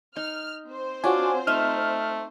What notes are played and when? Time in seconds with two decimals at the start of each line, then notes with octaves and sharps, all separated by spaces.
0.16 D#4 F6
0.67 C4 C5
1.04 D4 F4 F#4 C#5 G#5
1.47 A3 D#4 E5 F6